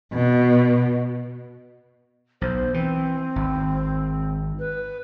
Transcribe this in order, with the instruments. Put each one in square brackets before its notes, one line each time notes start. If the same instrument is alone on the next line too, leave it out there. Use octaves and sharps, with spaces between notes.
[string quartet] B2
[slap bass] B1 [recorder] C5
[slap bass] E3 [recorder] C4
[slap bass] G#1
[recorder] B4